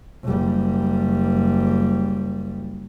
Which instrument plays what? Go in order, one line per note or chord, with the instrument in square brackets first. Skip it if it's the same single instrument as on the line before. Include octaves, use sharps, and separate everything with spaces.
[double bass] F#1 G3